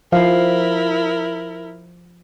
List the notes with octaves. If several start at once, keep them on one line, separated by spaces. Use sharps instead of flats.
F3 E4 A#4 F5